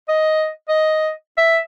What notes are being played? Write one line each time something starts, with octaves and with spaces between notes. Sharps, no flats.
D#5
D#5
E5